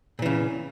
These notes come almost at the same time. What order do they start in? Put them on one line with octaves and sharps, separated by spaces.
A#2 E3 C#3